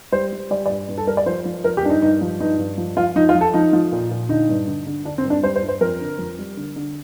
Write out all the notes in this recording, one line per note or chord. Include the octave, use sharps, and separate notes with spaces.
G3 C5
G3
G3 D5
D5
G2
G2
A4
G3 A#4
D5
F3 C5
F3
F3 A#4
G4
G2 D4
D#4
G2 D#4
F3
G2 D#4
G2
F3
F3 F4
F3 D#4
F4
F3
A4
F3 D#4
F3
A#2
A#2
D3 D#4
G2
D3
D3
D3 D4
C4
G2
D4
G3 C5
C5
G2
C5
F2 A#4
D3
F2
G3
D3
D3